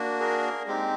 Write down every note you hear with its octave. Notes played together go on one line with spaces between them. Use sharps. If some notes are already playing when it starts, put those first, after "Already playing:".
Already playing: A#3 D4 F#4
G#4 A#4
G#3 C4 D#4 G4